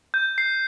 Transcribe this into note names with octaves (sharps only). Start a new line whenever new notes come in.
G6
C7